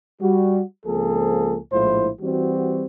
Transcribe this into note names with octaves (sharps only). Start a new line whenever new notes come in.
G3 F#4
C#2 F3 A#3 C4 G#4 A4
A#1 A2 G#3 E4 F4 C5
E3 G3 C4 F#4